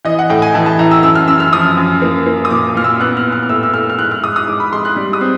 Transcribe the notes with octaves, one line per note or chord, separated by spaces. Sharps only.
E3 D#5
F#5
A2 G5
G#5
E3 A5
A5
E3 A#5
E6
F#2 E6
F6
F#2 E6
F6
F3 D#6
F#2
A#3
A#3
D#6
A#2 D6
A#2 F6
E6
B3 F#6
F6
B3
F6
F6
A2 E6
E6
A2 F6
F6
G#2 F#6
F6
G#2 D#6
D#6
G#2 D6
B5
G#2 C6
F#6
G3
D#6
C4